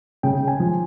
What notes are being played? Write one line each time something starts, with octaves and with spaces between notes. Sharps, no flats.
C#3 G5
G#5
F3